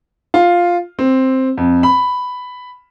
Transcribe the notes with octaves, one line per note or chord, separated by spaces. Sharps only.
F4
C4
F2
B5